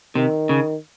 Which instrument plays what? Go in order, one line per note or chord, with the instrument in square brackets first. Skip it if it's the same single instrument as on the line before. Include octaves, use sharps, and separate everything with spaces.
[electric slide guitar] C3 [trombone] D#3
[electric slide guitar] C#3